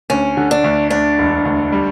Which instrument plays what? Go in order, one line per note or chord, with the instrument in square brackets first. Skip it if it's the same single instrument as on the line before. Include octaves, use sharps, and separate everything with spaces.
[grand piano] D2 [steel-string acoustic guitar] C#4
[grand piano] D3
[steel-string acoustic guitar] D4
[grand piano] D2
[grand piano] D2 [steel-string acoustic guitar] D4
[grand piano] E1
D2
G3